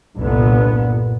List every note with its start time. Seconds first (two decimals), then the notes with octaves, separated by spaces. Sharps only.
0.18 G1 C2 A#2 D3 B3